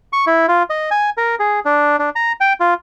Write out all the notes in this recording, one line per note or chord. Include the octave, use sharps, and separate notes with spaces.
C#6
E4
F4
D#5
G#5
A#4
G#4
D4
D4
A#5
G5
F4